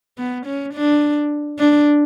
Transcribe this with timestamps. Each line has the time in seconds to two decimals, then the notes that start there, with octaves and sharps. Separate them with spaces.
0.18 B3
0.46 C#4
0.74 D4
1.59 D4